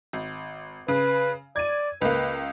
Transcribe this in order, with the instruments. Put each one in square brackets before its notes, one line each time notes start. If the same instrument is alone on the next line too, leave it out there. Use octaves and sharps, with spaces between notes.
[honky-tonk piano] G#1
[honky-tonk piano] C#3 [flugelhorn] B4
[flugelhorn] D5 [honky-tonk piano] G#6 D#7
[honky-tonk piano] C#2 A#3 [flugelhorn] B4